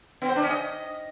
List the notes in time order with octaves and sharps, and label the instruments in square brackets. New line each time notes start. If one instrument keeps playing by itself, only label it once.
[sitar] B3
C5
D4
C#4
D#5